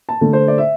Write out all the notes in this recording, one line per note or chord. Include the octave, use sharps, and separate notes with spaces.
A5
D3 A3
C5
D5
E5